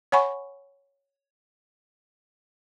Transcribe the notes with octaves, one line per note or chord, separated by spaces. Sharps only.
C#5 F#5 G#5 B5 C#6